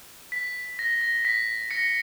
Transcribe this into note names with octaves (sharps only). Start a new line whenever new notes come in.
B6
A#6
A#6
B6
A#6 C#7